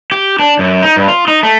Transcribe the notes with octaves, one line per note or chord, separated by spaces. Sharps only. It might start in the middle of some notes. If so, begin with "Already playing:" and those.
G4
D4
F#2
D#4
G2
F4
D#4
A3